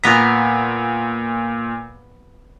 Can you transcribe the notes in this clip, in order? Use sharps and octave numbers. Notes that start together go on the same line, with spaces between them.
A#2 B3 A#5 B6